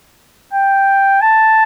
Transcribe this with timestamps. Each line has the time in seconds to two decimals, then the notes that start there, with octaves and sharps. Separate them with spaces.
0.54 G5
1.21 A5